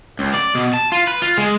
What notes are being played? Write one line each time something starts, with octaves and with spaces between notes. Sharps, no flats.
C#2
D5
B2
A5
F4
B4
F4
G#3